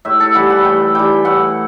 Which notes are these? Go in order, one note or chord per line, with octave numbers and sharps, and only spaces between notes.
A2 E5
A4
E3 G3 F#5
F#5
A2 G5
E3 G3 G5
A2 F#5